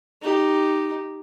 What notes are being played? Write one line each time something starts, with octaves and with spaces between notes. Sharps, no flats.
D#4 G4